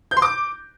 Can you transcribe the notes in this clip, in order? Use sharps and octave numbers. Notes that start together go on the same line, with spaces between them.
G6
C6
D6